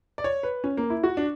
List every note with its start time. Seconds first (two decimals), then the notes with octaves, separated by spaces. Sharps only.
0.18 D5
0.24 C#5
0.43 B4
0.64 C#4
0.77 A#3
0.90 E4
1.04 F#4
1.17 D4